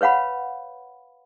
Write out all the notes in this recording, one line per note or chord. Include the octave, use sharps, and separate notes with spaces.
B4 C#5 F5 F#5 B5